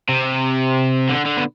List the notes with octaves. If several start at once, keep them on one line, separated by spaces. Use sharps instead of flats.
C3
D3
D3
B2